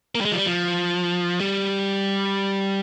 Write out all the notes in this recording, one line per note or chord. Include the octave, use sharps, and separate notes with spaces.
A#3
G3
G#3
F3
G3
F3
G3